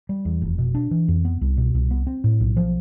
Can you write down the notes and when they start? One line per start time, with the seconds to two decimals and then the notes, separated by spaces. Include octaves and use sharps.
0.09 G3
0.25 E2
0.42 F1
0.58 B2
0.75 D4
0.91 E3
1.08 F2
1.25 B3
1.41 C2
1.57 B2
1.74 C2
1.91 B3
2.07 C4
2.24 A2
2.40 B1
2.56 F3